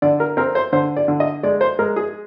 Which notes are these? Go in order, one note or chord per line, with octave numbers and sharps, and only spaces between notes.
D3 D5
A#4
C4 A#4
C5
D3 C5
D5
D3
D#5
G#3 D5
C5
G#3 A#4
G#4